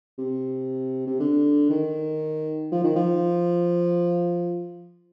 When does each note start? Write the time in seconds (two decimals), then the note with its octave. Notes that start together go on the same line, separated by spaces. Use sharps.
0.18 C3
1.07 C3
1.20 D3
1.70 D#3
2.72 F3
2.84 D#3
2.96 F3